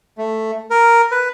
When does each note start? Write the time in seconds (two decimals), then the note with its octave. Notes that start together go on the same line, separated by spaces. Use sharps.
0.18 A3
0.70 A#4
1.11 B4